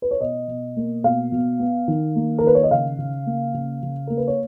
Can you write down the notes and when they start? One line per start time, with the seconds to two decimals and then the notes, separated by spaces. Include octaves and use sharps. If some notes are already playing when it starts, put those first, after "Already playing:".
0.02 B4
0.11 C#5
0.21 B2 D#5
0.48 B2
0.77 A#3
1.04 B2 F5
1.32 B2
1.60 B3
1.88 D#3
2.16 A#3
2.39 A#4
2.43 D#3 B4
2.55 C#5
2.63 D#5
2.71 C#3 F5
2.98 C#3
3.26 A#3
3.54 C#3
3.83 C#3
4.07 A#3 A#4
4.17 B4
4.27 C#5